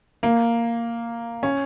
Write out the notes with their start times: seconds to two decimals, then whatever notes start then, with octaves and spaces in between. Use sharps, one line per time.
0.23 A#3
1.43 C#4